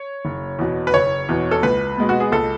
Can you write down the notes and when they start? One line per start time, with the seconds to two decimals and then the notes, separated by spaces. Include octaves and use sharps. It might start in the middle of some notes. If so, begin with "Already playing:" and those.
Already playing: C#5
0.25 F#1
0.59 E2 B2
0.87 B4
0.94 F#1 C#5
1.29 E2 B2
1.51 A4
1.63 C#2 B4
1.97 B2 G#3 B3
2.09 F#4
2.20 G#4
2.32 C#2 A4